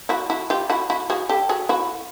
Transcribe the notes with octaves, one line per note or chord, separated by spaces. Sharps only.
E4 F#4
E4 F#4
F4 G4
E4 F#4
E4 F#4
F#4 G#4
G4 A4
F#4 G#4
E4 F#4